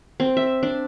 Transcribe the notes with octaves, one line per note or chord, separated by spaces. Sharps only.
C4
E5
D4